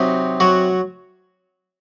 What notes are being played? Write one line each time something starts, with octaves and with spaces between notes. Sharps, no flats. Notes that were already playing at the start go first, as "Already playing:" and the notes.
Already playing: C3 F#3 C4 D#4
F#3 F#4